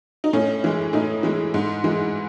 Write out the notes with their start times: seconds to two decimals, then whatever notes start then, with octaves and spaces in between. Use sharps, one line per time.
0.24 D#4
0.33 A2 C#4
0.64 E3 G#3
0.93 A2 D#4
1.23 E3 G#3
1.54 G#2
1.84 E3 G#3